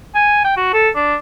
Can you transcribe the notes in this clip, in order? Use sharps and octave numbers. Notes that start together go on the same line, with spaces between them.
G#5
G5
F#4
A4
D4